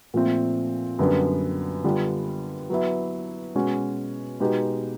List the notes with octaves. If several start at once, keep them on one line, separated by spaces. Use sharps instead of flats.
A#2 F3 A3 C4
F#2 D3 G3 B3
D3 G3 B3 D4 F4
F#3 B3 E4
B2 G#3 C#4 F#4
B2 G#3 B3 D#4 G4